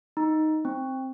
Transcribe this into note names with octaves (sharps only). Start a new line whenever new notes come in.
D#4
C4